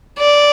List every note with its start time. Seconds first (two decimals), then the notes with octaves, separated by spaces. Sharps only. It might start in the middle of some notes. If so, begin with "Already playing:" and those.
0.19 D5